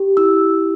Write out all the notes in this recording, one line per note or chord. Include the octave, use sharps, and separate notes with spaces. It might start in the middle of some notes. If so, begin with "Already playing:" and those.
Already playing: G4
E4 E6